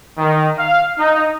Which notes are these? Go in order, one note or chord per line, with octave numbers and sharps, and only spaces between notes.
D#3
F5
D#4